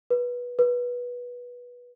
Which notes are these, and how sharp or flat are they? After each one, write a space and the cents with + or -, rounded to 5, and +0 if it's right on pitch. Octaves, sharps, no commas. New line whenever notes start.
B4 -15
B4 -15